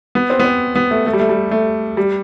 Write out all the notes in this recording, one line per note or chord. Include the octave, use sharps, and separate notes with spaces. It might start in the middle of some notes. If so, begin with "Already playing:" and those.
B3
C4
B3
C4
B3
A3
A3
G3
A3
G3
A3
G3